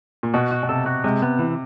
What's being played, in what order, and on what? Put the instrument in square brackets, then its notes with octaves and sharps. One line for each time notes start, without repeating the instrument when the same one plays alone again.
[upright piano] A#2
[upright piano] B2 [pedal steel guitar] F#4
[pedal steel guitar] F#4
[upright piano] B2
[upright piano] C3 [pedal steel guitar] A4
[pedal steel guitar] F#4
[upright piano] C3 [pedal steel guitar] G#3
[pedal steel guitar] B3
E3